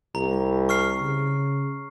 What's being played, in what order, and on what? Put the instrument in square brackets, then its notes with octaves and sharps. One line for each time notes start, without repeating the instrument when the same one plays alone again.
[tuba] C2 [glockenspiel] A#5
[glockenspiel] C#6 F6 C7
[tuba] C#3